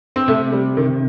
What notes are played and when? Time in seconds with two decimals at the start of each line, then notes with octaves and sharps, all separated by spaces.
0.16 C4
0.28 C3 A3
0.52 G3
0.77 D#3